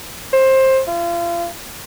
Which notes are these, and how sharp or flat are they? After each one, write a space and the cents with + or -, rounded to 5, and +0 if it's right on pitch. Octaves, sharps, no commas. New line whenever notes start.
C5 +20
F4 -35